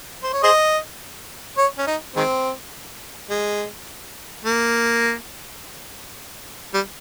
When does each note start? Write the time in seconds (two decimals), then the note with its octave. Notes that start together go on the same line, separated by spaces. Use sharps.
0.23 C5
0.33 C#5
0.43 G#4 C5 D#5
1.58 C#5
1.79 C#4
1.87 D#4
2.16 D#3 G#3 C4
3.30 G#3
4.45 A#3
6.74 G3